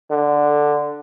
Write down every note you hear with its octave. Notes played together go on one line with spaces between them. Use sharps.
D3